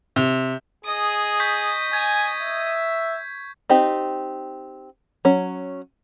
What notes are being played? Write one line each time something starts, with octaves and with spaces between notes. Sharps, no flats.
C3
G#4 D#5 D#6
C#6 G6 B6
G#5 G#6
E5
C4 D#4 G4
F#3 C#4